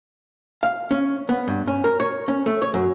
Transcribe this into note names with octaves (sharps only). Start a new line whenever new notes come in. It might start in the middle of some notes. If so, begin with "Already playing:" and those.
F5
C#4
B3
G2
C#4
A#4
C#5
C#4
A3
C#5
F#2